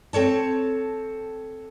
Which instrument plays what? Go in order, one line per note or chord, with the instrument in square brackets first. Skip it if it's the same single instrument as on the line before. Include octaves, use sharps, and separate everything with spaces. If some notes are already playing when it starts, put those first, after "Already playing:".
[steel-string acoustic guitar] C4 A4 C#5 A5